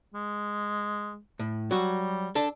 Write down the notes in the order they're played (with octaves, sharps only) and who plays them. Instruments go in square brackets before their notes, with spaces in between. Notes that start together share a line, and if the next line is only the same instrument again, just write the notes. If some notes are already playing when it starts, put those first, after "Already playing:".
[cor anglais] G#3
[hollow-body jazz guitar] A2
[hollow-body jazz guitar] F#3 F#4 [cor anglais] G3
[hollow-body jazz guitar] D4 A4